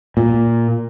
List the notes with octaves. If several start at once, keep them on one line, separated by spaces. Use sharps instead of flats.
A#2